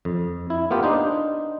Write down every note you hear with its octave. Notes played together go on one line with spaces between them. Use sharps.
F2
E4
A#3 B3 F4 G4
D4 D#4 C5